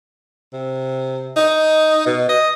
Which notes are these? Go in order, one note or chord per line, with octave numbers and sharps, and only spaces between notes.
C3
D#4
B2
D#5